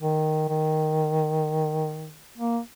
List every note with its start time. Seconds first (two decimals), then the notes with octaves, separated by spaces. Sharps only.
0.02 D#3
0.49 D#3
2.38 A#3